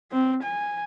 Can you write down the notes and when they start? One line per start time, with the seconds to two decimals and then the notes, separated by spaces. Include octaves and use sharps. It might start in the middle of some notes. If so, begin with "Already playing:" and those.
0.12 C4
0.43 G#5